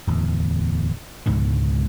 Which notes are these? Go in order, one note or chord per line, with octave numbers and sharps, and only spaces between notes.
D1 E2
C#2 G#2 B2 D3